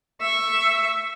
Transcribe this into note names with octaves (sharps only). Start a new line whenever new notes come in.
E5 C#6